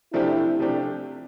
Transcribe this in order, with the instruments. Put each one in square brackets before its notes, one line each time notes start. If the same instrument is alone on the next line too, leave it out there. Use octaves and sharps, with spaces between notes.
[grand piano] C3 F3 A3 D4 G4 [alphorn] E4
[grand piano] C3 F3 A3 D4 G4